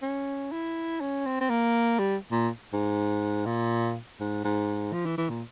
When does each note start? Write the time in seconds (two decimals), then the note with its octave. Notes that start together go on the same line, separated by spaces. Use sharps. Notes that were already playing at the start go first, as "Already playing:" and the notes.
0.02 C#4
0.52 E4
1.00 C#4
1.26 C4
1.41 C4
1.50 A#3
1.99 G3
2.32 A#2
2.73 G#2
3.46 A#2
4.20 G#2
4.44 G#2
4.93 F3
5.06 E3
5.17 E3
5.30 A#2